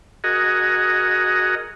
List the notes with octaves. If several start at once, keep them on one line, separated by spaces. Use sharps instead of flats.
F#4 G#4 A#4 D#5